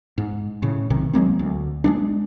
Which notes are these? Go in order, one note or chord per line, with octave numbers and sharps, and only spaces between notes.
G#2
A2 C#3
B1 C3 D#3
F#3 G#3 A#3 C4
D2
G#3 A#3 D4